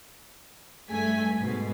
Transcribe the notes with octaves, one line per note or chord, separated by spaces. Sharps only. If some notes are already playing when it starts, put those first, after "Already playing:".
G2 A3 G#5 B6
G#2 B2